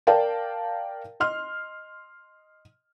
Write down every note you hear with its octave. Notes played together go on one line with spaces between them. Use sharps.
A#4 D5 F5 G5 A5
D#5 C6 F6